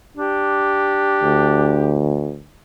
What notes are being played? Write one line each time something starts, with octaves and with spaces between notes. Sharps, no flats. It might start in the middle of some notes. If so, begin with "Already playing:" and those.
D4 G4
D2